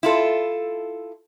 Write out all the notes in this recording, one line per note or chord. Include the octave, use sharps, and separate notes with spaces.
E4 F4 A4